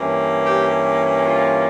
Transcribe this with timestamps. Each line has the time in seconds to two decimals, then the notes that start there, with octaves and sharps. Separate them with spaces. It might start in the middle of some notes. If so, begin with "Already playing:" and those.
Already playing: G2 E3 A#3 C#4
0.43 G4
1.24 F4